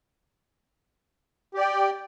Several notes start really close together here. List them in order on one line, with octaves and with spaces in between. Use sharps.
G4 D5 G5